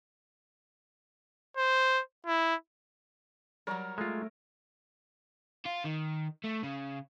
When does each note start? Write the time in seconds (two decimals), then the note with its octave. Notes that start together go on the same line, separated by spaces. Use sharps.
1.57 C5
2.27 E4
3.67 F#3 G3 A#4 C#5 A#5
3.98 G#3 A3 F4
5.66 F4
5.85 D#3
6.44 A3
6.63 C#3